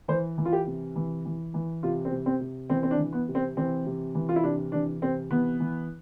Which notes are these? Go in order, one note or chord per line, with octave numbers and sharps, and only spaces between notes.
E3 C5
E3
F4
G4
C3
E3
E3
E3
C3 F4
C4
C3
C4
C3
E3 C4
C4
D4
E3
B3
C3
C4
E3 C4
C3
E3
F4
E4
C3 D4
E3 D4
C3 C4
E3 B3
E3